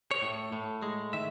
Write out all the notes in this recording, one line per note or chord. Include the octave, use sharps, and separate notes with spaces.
C#5
A2
A2
G#3
D#3 E5